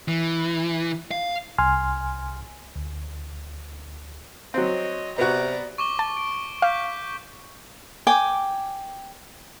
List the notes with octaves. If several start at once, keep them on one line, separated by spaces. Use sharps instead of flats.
E3
F5
C2 G#5 C6 F6
D2
F#3 C4 C#5 D#5
C3 B3 F#4 D5 A#5
C#6 D6 G7
A5
D7
F5 D6 G6 B6
G5 G#5 D6